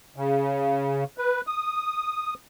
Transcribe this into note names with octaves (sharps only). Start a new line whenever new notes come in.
C#3
B4
D#6